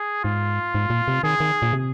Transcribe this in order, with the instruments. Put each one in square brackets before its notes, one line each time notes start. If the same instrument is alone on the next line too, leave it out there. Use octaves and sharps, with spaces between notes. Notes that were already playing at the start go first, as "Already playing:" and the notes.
Already playing: [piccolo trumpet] G#4
[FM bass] G#2 [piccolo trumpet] F4
[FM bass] G#2
A#2
C3
[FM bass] D#3 [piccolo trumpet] G#4
[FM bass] D#3
A#2
C3